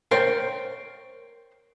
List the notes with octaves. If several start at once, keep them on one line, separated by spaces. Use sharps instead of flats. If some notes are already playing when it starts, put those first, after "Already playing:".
A#4 C5 C#5 G5